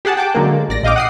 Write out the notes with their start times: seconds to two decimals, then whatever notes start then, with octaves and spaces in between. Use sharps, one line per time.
0.05 G4 G#4 F#5 A5
0.17 G5 A5 D6
0.34 D3 F#3 G#3 A#3
0.69 A1 D5 A#6
0.83 A#1 D#5 F5 G5 D6
0.96 F#5 D#6 C7